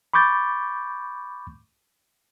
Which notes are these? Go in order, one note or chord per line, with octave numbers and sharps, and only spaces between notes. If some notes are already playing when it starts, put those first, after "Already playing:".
B5 C#6 D6 G6 A6